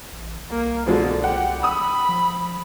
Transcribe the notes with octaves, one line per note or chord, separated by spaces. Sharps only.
A1
C2 A#3
B2 D3 F3 G#3
G4 F#5
B5 D#6 E6
F3